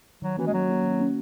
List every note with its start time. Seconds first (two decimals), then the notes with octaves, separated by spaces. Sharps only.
0.22 D#3 F#3
0.38 E3 A#3 C#4 F#4
0.47 G#3
0.53 D#3 F#3
0.69 A#3 C#4 F#4
0.84 D#3
0.99 A#3 C#4 F#4